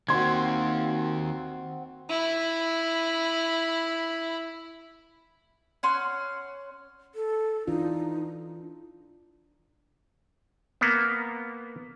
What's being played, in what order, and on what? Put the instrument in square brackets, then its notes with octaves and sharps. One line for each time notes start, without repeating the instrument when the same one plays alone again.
[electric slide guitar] D#3 A#3 [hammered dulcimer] C4 F#4 [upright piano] C6 G#6
[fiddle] E4 B5
[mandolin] C#4 C#5 F#5 C6
[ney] A4
[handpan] E3 D4 F4 [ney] D#4
[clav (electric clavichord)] A#3 B3